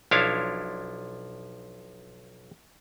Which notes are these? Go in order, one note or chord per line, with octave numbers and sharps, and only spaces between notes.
B1 F3 D4 E4 C#5 F5